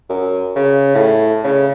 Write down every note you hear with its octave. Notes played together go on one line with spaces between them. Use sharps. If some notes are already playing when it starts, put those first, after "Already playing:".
F#2
C#3
A2
C#3